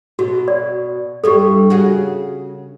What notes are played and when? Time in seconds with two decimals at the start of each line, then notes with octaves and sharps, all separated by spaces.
0.19 B2 F#4
0.48 D5
1.24 G2 G3 E4 G4 A4
1.70 C#3 F#4 G#4